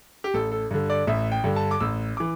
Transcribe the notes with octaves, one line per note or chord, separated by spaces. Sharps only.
G4
A1 A4
A4
G2 D3
D5
A1 E5
G5
G2 D3
A5
D6
A1 E6
E3 D6